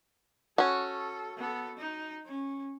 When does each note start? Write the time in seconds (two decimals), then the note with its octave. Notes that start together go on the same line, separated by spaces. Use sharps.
0.58 C#4 F#4 A4
1.37 B3 A4
1.78 D#4
2.26 C#4